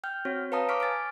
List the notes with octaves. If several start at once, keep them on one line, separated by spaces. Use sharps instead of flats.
G5 F6 G6
C4 F#4 C#5
B4 C#5 F5 A5 A#5 D#6
C#6 D6 F6 B6 D7
G#5 A6 B6 D7